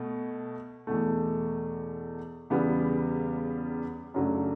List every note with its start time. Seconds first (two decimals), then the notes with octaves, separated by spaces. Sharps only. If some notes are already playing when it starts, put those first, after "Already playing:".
Already playing: B2 A3
0.87 E2 B2 A3
2.50 E2 C#3 G3 B3
4.14 F#2 C#3 F#3 A3 D4